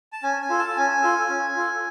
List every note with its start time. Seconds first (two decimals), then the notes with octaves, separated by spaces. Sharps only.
0.13 A5
0.23 C#4 G#5
0.42 G#5
0.50 F4 A4
0.59 A5
0.77 C#4 G#5
1.03 F4 A4
1.29 C#4
1.56 F4 A4